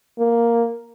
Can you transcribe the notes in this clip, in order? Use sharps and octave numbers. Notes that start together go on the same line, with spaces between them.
A#3